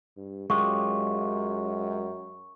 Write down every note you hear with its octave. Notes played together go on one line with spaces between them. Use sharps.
G2
F#2 G#3 F4 G4 C#6